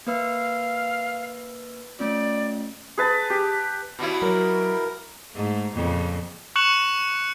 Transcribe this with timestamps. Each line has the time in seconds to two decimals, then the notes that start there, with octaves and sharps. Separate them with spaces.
0.07 A#3 B4 F5 E6
1.99 A3 C#4 F4 D5
2.97 G#4 B4 A5
3.30 G4
3.99 B2 G3 E4
4.22 F#3 A#4
5.32 G#2 A3
5.74 F2 A#2 C#3
6.56 C#6 F#6 C#7 E7 F#7